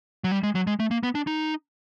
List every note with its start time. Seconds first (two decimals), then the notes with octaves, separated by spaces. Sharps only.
0.24 F#3
0.32 G3
0.43 G#3
0.55 F#3
0.67 G#3
0.80 A3
0.91 A#3
1.03 B3
1.15 D4
1.27 D#4